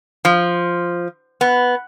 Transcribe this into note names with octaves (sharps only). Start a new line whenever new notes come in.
F3
B3